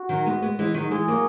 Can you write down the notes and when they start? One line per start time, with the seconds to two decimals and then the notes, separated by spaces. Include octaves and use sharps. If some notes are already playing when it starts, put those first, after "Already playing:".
Already playing: F#4
0.09 D#3 F#3
0.25 G#3 B3
0.42 G#3 B3
0.59 E3 G#3
0.74 D#3 F#3
0.91 E3 G#3 G#4
1.08 F#3 A#3